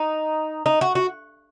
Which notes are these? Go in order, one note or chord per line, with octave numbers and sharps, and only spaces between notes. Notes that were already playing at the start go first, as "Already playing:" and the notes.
Already playing: D#4
D#4
F#4
F#4